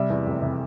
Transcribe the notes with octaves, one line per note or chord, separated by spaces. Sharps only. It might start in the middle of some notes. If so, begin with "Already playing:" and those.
Already playing: C3 G3 E5
E2
F1
C3